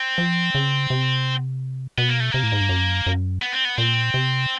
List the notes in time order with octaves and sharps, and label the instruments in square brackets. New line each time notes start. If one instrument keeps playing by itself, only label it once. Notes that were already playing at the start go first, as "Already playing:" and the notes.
Already playing: [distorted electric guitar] C4
[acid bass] F3
C#3
C3
[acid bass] B2 [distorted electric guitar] B3
[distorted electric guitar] A#3
A3
[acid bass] C3 [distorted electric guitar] A#3
[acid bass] A2
G#2
G2
F#2
F#2
[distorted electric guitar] B3
C4
B3
[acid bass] A#2 [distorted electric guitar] C4
[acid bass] C3